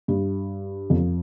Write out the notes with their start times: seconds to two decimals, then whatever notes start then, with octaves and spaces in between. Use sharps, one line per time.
0.08 G2
0.90 F2